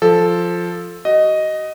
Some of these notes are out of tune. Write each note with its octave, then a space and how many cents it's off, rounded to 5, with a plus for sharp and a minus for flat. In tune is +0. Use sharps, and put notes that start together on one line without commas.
F3 +0 A4 -5
F#4 +35 D#5 +0